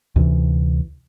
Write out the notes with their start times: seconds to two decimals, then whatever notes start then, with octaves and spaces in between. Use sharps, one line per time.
0.16 D2 C3 E3